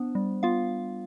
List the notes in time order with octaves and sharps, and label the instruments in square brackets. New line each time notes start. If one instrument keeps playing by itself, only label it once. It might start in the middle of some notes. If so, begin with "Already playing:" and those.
Already playing: [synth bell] B3 D4 C5
G3
B3 F4 F5